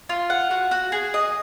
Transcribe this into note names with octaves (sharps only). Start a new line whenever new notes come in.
F4
F#5
F#4
F#4
G#4
D#5